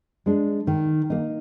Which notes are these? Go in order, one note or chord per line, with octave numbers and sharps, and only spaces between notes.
G#3 D4
D#3
A#3 D#4